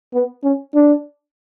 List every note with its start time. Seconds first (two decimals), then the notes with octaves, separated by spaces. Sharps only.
0.14 B3
0.44 C#4
0.75 D4